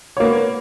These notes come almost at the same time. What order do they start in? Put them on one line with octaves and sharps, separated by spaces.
C#5 A#3 B3